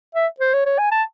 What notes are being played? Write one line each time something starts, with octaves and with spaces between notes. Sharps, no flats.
E5
C5
C#5
C#5
G#5
A5